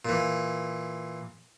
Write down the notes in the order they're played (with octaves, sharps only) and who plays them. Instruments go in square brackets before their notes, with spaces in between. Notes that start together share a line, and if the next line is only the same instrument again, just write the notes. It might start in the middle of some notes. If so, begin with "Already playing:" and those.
[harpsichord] A#2 E3